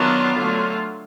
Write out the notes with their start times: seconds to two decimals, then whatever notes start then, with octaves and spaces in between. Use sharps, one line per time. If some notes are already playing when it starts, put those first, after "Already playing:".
Already playing: D#3 F#3 B3 D4 F4
0.36 D3 F#3 A3